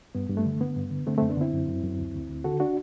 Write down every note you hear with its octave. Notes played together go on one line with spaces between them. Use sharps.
G2 B3
G2
A3
D3
D3 B3
G2
D3
D3 A3 C4
F#2 A3 C4
B3 D4
D3 C4 E4
F#2
F#2
F#2
D2
D2
D2
D3 F#4 A4
D4 F#4